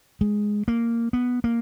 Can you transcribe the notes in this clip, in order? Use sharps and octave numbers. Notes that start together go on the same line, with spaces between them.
G#3
A#3
B3
A#3